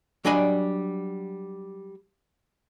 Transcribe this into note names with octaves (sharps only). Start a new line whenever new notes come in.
F#3 G3 D4 D#5 G#5 B5